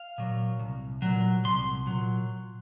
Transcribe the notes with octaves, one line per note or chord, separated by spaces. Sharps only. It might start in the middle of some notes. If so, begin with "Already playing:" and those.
Already playing: F5
A#2 F#3
C2
A#2 F#3
C2 C6
A#2 F#3